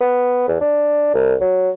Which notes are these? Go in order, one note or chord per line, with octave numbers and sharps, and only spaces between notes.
B3
E2
D4
C2
F#3